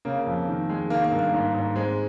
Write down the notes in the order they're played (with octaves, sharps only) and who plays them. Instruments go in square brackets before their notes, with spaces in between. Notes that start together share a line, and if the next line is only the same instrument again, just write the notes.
[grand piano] C#3 A#3
F2
D#3
G#3
D#3 A#3
A#3
G2
A#3
G#2
G#2
G#3 C4